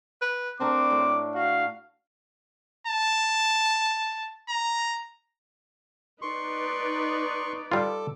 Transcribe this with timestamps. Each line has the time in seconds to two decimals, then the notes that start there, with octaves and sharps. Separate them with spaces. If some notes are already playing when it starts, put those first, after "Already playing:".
0.22 B4
0.60 A3 C4 D4 A#4 D6
0.91 A2
1.35 F#4 F5
2.87 A5
4.49 A#5
6.22 D#4 B4 D5 C6 C#6
7.72 G3 F4 A4 D6